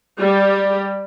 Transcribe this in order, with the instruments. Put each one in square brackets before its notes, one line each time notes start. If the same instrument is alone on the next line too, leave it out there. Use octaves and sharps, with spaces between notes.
[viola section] G3 G4